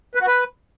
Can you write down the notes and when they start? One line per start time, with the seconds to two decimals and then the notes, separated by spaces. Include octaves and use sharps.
0.15 B4
0.21 F#4
0.27 B4